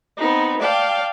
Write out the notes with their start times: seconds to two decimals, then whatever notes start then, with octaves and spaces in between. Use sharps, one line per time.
0.18 B3 C4 D#4
0.61 D5 F5 G5 A5